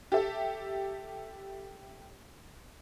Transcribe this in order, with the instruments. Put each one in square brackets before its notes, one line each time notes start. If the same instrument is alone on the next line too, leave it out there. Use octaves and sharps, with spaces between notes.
[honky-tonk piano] G4 A4 E5